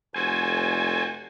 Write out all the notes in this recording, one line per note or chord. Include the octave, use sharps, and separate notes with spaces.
F1 F#4 A4 C5 G#5